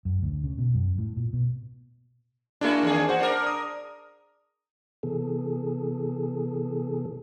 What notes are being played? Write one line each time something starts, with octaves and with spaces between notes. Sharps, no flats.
F#2
D2
C#3
B2
F#2
A2
A#2
B2
G#3 A#3 D4 E4 F#4
E2 D#3 G#4
F#4 C5 F#5
D4 A#4
D#6
C3 E3 B3 G#4 A4